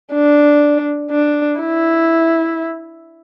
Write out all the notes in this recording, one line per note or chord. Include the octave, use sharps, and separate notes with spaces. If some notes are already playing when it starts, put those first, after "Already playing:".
D4
D4
E4